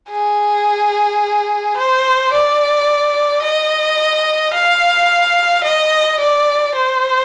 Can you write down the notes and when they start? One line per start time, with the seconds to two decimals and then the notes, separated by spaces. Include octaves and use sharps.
0.11 G#4
1.77 C5
2.32 D5
3.43 D#5
4.54 F5
5.64 D#5
6.20 D5
6.75 C5